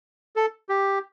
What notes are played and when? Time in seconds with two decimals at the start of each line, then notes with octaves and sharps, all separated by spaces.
0.36 A4
0.69 G4